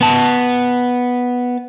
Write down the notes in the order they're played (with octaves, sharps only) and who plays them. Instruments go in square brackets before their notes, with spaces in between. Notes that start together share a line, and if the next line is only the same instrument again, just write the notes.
[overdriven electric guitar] B3 A5